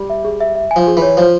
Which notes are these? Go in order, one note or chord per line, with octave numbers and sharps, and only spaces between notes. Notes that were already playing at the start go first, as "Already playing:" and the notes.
Already playing: G3
E5
G#4
E5
E5
G#5
F3
G#4
E3 C#5
F3 C5